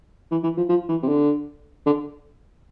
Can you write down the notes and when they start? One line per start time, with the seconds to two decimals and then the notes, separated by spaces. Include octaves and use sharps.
0.31 E3
0.43 E3
0.57 F3
0.69 F3
0.89 E3
1.03 C3
1.08 D3
1.86 D3